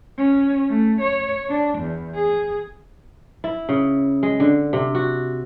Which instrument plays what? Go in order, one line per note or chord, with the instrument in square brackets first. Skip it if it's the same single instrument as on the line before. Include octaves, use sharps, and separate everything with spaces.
[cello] C#4
A3
C#5
D4
E2
G#4
[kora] E4
C#3
G#3
D3
C3
F#4